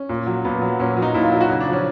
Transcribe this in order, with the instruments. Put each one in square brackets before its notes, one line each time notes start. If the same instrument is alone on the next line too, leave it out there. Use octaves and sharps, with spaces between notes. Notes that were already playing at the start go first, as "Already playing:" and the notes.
Already playing: [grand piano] C#4
A#2
F#3
A#2 B3
F#3
A#2 C#4
F#3
D#4
A#2 E4
F4
F#3
F#4
C#3
D4
F3
C#4